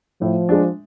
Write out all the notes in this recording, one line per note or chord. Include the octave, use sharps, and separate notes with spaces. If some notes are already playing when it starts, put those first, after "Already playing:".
A2 F3
G#3 D4